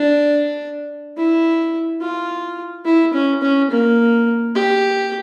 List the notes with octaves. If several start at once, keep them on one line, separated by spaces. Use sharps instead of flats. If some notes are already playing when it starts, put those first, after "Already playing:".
Already playing: D4
E4
F4
E4
C#4
C#4
A#3
G4